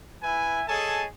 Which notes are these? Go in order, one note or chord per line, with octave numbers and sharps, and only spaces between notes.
E4 B4 E5 G#5
G#4 A4 C#5 D#5 G#5 A5